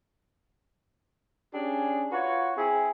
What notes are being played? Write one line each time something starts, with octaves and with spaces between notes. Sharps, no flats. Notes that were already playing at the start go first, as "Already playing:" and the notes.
C#4 D4 G4 G#4
F4 F#4 B4 C#5
C4 E4 G#4